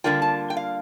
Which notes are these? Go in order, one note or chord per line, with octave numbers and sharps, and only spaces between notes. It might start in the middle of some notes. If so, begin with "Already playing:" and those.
D3 G3 A#3 D4 F4 G5
A5
G5
F5